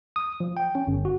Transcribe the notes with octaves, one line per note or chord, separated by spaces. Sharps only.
D#6
F3
G5
C#4
G1
F#4